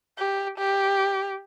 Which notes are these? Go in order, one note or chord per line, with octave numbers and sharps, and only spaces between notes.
G4
G4